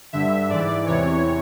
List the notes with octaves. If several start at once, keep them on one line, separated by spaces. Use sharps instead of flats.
G2 D3 E5
G#2 E3 D5
E2 C3 E3 C#5